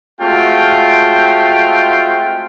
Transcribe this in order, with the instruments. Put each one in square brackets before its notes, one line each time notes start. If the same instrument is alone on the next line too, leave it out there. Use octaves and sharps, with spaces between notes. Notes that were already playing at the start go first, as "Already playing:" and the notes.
[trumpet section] G#3 A3 C4 F4 F#4 G5